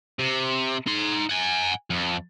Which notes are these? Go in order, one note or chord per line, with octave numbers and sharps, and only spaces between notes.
C3
D#4 C6
F#5 G#5
F2